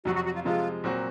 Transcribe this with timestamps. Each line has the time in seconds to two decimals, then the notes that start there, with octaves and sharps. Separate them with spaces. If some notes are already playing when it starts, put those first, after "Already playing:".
0.05 F2 C3 F#3 F#4
0.15 F#4
0.25 F#4
0.35 F4
0.45 C3 F3 G#3 F4
0.84 A#2 F#3 C4 F#4